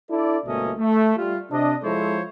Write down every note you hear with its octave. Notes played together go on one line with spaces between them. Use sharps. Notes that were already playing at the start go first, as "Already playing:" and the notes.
D4 E4 A4 D5
G1 B2 A3 A#3 C#4 D#5
A3
G3 F4
C3 D4 D#5
F3 G#3 E4 A4 C5 C#5